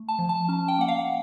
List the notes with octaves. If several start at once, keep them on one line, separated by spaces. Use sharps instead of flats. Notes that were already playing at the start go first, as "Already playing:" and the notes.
Already playing: A3
A5
F3
A5
C#4 A5
G5
A#3 F#5
F5